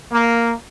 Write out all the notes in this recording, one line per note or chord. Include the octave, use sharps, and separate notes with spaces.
A#3